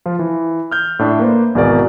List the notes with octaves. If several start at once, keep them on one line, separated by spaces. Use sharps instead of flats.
F3 F4
E3
F6 G6
A2 D4 E5
A#3 B4 C5
G#1 E2 B2 G#4 A#4 D5